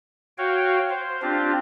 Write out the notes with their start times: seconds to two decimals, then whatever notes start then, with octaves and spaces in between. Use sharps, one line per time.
0.38 F#4 C#5 F5 G5
0.90 C5
1.22 C4 D4 F4 G4